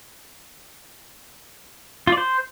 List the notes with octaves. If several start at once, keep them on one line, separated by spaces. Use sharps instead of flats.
F4
D5
C5